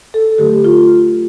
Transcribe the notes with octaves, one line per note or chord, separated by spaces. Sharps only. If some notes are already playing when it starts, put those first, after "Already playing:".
A4
D3 F#3 A3 G4
F4